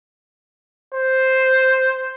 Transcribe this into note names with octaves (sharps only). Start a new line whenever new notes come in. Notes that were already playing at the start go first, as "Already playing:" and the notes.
C5